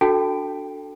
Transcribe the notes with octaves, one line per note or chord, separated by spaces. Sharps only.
D4 F#4 A4 G5 A5